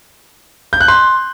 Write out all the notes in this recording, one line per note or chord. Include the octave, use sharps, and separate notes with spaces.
G6
F#6
C6